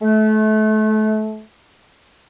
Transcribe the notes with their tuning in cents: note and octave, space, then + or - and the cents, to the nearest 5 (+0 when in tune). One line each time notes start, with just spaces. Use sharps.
A3 -30